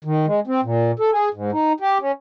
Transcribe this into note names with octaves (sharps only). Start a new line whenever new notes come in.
D#3
G#3
C4
A#2
A4
G#4
G#2
D#4
G4
C#4